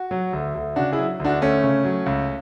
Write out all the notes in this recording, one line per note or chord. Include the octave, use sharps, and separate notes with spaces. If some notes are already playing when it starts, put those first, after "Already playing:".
Already playing: F#4
F#3
D2
D2
C#3 D4 F#4
E4 G#4
F#3
D2
D4 F#4
D2 A3 C#4
C#3
F#3
C#2